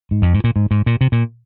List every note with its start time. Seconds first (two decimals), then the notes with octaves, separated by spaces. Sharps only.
0.11 G#2
0.22 F2
0.34 G#2
0.44 A#2
0.56 G#2
0.71 G#2
0.86 A#2
1.01 C3
1.12 A#2